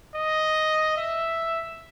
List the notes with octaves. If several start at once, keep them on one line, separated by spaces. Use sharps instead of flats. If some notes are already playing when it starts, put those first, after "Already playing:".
D#5
E5